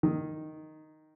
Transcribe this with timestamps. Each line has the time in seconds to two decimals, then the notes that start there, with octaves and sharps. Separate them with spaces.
0.03 D#3